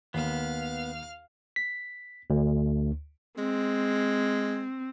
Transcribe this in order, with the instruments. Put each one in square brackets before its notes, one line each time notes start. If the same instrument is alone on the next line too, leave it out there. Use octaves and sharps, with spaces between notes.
[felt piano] D#2 [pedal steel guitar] B3 [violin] F5 F6
[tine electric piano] B6
D2
[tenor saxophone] G#3 [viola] C4